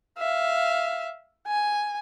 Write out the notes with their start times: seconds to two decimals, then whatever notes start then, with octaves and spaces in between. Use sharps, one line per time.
0.18 E5 F5
1.47 G#5